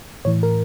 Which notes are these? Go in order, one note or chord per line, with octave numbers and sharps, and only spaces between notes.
A2 E3 C#5
A#4